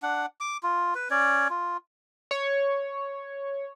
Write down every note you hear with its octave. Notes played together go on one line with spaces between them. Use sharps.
D4 F#5
D6
F4
B4
C#4 C#5 D5
F4
C#5